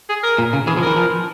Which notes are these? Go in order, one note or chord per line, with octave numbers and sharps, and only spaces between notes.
G#4
A#4
A#2
C#3
E3 G#4
F3
E3 A#4
F3